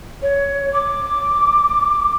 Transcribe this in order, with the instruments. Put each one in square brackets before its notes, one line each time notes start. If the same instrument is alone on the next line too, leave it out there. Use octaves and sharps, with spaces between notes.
[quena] C#5
D6